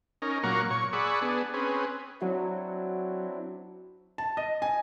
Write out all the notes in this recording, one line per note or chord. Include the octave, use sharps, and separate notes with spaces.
C#4 D#4 A#4
A#2 F#3 A#3 F#5 A#5 C#6
A#2 C#5 C#6
G#4 D5 F#5 B5 C#6 E6
B3 D4 G#4
C4 C#4 G#4 B4
F#3 C4 D4 E4 F#4
A5
D#5
G#5